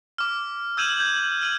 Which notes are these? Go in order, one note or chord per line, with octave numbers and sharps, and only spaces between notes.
D6 F6
E6 G6 G#6 D#7 E7 F#7
G6 G#6
F6 D#7 F#7